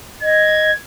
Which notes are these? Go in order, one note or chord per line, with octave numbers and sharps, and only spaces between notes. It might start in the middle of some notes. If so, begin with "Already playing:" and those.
D#5 G#6